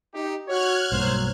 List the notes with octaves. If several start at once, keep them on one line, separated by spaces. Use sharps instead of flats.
D#4 G4
F#4 C#5 F6 F#6 G#6
B1 G2 F#3 A#3 C5